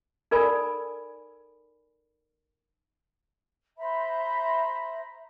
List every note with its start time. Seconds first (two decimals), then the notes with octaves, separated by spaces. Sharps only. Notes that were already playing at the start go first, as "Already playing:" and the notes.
0.31 D#4 A4 A#4 D5 G#5 B5
3.78 C5 E5 A#5 B5